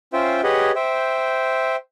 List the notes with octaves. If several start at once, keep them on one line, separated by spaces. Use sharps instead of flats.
C#4 F4 C5 E5 G5
G4 G#4 B4 C#5 D#5 F#5
C5 E5 G5